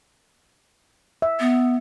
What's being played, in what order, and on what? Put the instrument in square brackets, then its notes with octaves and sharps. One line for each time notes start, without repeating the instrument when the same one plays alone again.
[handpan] E5
[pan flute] B3